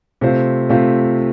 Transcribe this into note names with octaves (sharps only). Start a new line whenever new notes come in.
C3 A3 F4 C5
C3 A3 F4 C5